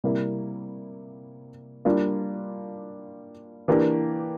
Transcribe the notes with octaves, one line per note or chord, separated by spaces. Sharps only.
C3 G3 A#3 E4
G3 A#3 D4 F4
E3 A#3 D4 G4